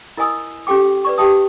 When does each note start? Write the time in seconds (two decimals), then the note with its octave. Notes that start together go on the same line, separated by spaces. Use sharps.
0.17 E4 A#4 D#5 G#5 D#6 E6
0.67 C#4 G4 A4 G5 D6
1.05 B4 D5 C#6
1.18 G4 E5 G5 A5 D#6